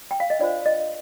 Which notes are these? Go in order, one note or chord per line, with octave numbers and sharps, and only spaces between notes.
G5
F5
D#5
D4 F4 C5 D5
D#5